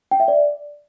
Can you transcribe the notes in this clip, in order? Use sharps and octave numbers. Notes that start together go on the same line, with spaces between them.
G5
E5
D5